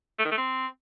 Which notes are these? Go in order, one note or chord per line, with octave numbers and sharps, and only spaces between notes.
A3
D#3
A3
C4